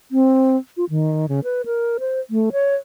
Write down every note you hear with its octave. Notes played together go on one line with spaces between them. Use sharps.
C4
F4
D#3
C#3
B4
A#4
C5
A3
C#5